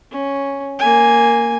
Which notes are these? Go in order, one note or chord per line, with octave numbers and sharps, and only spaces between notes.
C#4
A#3 G#5